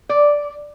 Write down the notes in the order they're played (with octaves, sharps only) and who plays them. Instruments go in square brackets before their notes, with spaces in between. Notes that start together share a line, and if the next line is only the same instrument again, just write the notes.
[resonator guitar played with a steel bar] D5